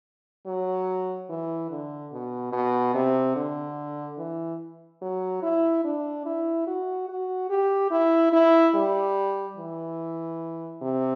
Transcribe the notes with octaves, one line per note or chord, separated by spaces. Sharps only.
F#3
E3
D3
B2
B2
C3
D3
E3
F#3
E4
D4
E4
F#4
F#4
G4
E4
E4
G3
E3
C3